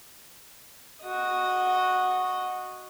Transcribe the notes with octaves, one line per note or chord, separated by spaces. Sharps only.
F#4 D#5